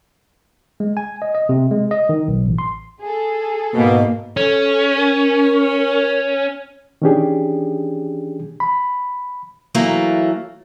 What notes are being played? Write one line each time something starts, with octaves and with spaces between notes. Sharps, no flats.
G#3
G#5
D#5
D#5
C3
G#3
D#5
D#3
B1
A1
C6
G#4 A4
G#2 B2 A#3
C#4 A4
A#4
D#3 E3 C#4 D4 G4 G#4
B5
E3 F#3 A3 A#3